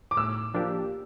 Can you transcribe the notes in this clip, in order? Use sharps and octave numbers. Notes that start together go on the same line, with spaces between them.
D6
A2 E6
F3 A#3 D4 G4